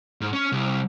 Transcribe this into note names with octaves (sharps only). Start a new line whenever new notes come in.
G#2
C#4
C2